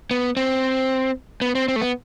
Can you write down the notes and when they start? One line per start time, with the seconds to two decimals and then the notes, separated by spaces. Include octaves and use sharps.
0.11 B3
0.37 C4
1.41 B3
1.55 C4
1.68 C4
1.76 A3
1.81 B3